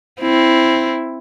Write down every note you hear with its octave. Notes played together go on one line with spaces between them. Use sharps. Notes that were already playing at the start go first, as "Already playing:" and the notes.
C4 E4